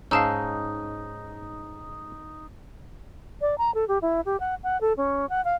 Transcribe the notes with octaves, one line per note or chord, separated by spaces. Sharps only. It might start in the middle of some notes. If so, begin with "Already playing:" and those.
G#2 C#4 D#4 F5 A5 E6
D5
A#5
A4
G4
E4
G4
F#5
F#5
A4
C#4
F#5
F5